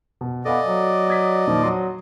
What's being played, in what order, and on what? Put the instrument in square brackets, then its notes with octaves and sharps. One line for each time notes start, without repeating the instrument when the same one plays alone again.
[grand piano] B2
[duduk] B3 [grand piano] A4 F5 G#5 [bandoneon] D5 D#5
[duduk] F#3
[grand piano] D#6 G#6 B6
[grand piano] A#2 D#3 [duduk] F3
[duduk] F#3 [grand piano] C6 D#6